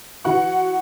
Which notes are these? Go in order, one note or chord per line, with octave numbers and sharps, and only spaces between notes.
E3 F#4 F#5 C#6